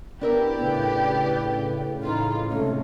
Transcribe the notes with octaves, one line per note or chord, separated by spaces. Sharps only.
B3 D4 E4 G4 A#4 D5 E5
A2 C#3 B4
F2 D3 E3 D#4 F4
G#2 C3 A3 C#4 D#4